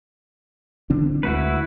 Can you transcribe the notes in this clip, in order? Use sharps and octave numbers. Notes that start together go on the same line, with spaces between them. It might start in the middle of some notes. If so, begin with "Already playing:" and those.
D3 C4 D4
D2 G#3 E4 F#4 B4